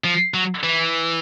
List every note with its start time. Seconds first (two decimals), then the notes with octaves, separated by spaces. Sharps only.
0.04 F3
0.34 F#3
0.63 E3